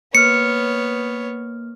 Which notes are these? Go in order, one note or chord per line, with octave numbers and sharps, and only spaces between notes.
A#3 B3 C#5 F6 C#7